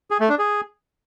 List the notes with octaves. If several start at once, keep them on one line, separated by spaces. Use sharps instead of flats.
G#4
A3
D4
G#4